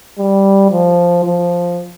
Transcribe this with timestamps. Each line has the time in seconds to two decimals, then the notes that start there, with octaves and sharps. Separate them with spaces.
0.18 G3
0.71 F3
1.25 F3